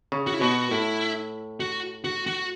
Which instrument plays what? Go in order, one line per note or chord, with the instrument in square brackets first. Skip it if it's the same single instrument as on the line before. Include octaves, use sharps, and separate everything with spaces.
[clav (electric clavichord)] C#3
[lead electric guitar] F#4
E4
[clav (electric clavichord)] B2 [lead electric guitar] F#4
[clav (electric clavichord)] A2 [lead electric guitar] E4
[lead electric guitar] F#4
F#4
F#4